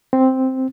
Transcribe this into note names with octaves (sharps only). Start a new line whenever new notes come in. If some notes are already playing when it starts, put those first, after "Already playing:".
C4